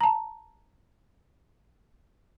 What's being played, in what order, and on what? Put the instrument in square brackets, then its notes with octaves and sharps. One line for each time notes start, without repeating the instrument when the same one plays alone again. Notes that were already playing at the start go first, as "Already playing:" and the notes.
[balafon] A5 A#5